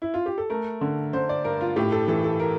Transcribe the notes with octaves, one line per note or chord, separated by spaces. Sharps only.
E4
F4
G4
A4
A3 A#4
D3
D3 C5
D5
G2 A#4
F4
A2 G4
A4
E3 A4
A4
A#4